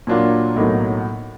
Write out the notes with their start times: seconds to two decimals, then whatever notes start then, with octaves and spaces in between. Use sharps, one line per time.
0.07 A#2 F#3 A#3 D4 F4
0.56 B1 A2 F#3 A#3 D#4